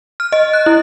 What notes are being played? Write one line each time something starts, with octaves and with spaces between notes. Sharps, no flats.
F6
D#5
F#6
E4